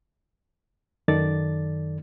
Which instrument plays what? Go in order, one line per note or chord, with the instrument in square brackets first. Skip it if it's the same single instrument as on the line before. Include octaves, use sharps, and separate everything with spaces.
[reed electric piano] F#2 D#3 A4 D5 A6